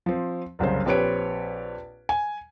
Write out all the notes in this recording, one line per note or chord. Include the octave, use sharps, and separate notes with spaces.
F3 C4
F#1 C2 C#3 C5
A#1 C4 G4 B4 C#5 D7
G#5